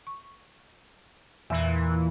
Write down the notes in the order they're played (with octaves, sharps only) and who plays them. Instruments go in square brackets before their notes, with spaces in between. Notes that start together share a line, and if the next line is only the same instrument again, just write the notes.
[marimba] C#6
[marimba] E2 E5 E6 [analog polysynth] A#2 E3